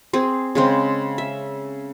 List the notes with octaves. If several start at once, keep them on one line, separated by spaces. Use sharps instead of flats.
C4 G#4
C#3 G#3 C4
E5